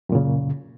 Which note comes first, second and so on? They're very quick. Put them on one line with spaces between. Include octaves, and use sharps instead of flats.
F#2 A#2 C#3